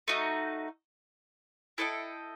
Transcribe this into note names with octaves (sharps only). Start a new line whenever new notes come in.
A3 D#4 F#4
E4 A4 D#5 G5